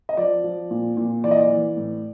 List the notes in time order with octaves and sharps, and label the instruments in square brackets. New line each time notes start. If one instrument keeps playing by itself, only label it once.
[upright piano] D#5
F3 D5
F3
A#2
A#2
E3 D5
D#5
D5
E3
A2